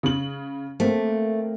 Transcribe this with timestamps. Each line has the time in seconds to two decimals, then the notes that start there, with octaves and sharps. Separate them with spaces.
0.03 C#3 F#7
0.80 A3 A#3 C4